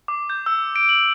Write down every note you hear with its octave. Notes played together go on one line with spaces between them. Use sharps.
D6
G6
E6
D7
F#7